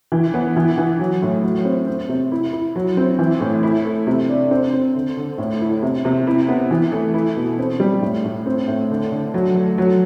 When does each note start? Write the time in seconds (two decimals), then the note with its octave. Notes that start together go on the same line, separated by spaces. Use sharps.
0.12 E3
0.34 B3
0.56 E3
0.78 E3
0.99 F#3
1.22 A2
1.43 F#3
1.65 C4
1.87 C4
2.09 C3
2.32 E4
2.53 E4
2.76 F#3
2.97 C4
3.19 E3
3.41 A2
3.63 E4
3.85 A3
4.07 C3
4.29 D4
4.51 C4
4.74 C4
4.95 D3
5.17 D3
5.38 A2
5.61 E4
5.82 C3
6.05 C3
6.27 E4
6.48 B3
6.71 E3
6.92 A3
7.14 E4
7.36 B2
7.58 C4
7.80 G3
8.02 A2
8.24 A2
8.46 C4
8.68 A2
8.90 D3
9.12 D3
9.34 F#3
9.55 A3
9.78 F#3